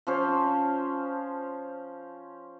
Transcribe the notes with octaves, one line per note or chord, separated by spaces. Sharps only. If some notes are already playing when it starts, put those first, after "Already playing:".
F3 C#4 C5